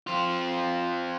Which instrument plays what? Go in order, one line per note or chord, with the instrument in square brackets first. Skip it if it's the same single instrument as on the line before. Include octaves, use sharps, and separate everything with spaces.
[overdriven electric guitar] C4 F4